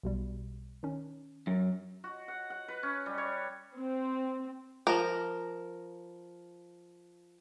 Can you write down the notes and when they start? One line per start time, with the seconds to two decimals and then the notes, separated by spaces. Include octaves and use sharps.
0.03 B1 B2 G3
0.83 D#3 C#4
1.47 F#2
2.04 F#4
2.28 F#5
2.50 F#5
2.68 B4
2.83 C#4
3.06 G3
3.18 C#5
3.75 C4
4.87 F3 A#4